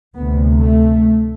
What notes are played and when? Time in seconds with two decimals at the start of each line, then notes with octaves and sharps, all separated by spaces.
0.15 D2 C3 B3
0.58 A3